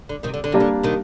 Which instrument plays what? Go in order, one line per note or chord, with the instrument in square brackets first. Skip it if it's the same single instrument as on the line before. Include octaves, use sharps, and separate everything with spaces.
[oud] D3
C3 D#3
D3
D3
[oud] C3 [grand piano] G3 A#3 D4
[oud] D3
C3 D#3